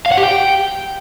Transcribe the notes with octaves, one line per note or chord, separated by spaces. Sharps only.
F5
F#5
G4
G5